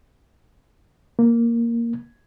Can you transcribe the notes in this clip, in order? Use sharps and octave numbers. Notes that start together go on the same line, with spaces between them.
A#3